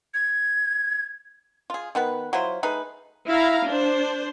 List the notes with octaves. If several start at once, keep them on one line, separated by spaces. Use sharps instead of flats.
G#6
F4 G#4
D#3 B3 B4
F#3 E4 F4 C5
A3 D#4 G#4 B4
E4 F5 A#5
D4 C5